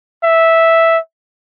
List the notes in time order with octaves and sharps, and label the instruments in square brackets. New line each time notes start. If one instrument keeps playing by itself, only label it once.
[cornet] E5